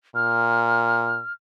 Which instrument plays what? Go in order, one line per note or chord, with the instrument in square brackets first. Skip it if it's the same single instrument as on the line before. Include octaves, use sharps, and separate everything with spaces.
[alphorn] A#2 [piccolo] F6